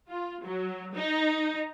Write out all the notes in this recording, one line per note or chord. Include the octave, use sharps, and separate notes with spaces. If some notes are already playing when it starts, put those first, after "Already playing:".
F4
F#3
D#4